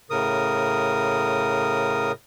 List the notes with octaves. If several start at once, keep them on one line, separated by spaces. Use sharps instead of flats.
A2 C#3 A#4 D#6